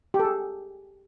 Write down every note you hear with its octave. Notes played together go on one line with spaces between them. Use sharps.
G4
A4
G#4